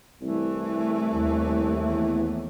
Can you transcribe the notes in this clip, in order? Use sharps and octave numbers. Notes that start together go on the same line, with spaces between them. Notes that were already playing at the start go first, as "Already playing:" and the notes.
C2 E3 A3
D#2
E2